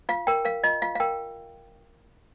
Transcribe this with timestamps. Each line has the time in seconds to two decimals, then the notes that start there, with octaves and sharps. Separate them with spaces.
0.09 F4 F5
0.27 A#4 G5
0.45 A#4 F5
0.64 F4 D#5
0.82 F4 F5
0.95 F5
1.00 A#4 G5